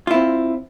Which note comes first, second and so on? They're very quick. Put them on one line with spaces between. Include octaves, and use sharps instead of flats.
F4 E4 C4